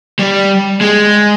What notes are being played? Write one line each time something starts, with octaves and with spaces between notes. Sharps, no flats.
G3
G#3